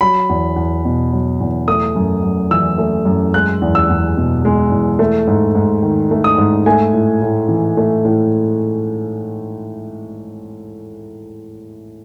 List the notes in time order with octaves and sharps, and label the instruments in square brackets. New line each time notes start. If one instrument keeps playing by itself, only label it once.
[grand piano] F#3 B5
E2
E2
B2
F#3
E2
A3 D#6
F#2
F#2
E3 E6
A3
F#2
G#3 F#6
E2
E6
E2
B2
G#3
E2
A3
G#2
G#2
D#3
A3
D#6
G#2
A3 G#5
A2
A2
E3
A3
A2